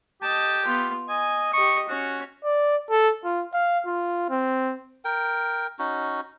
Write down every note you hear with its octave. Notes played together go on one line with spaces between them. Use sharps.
G4 D#5 A5
B3 F4
D#5 G#5
G4 D#5 C#6
C#4 F#4
D5
A4
F4
F5
F4
C4
A#4 G5
C#4 D#4 F#4